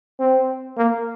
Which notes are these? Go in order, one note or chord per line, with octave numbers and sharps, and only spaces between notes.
C4
A#3